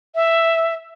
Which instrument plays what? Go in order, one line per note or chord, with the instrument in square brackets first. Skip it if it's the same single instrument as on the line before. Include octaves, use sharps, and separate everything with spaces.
[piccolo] E5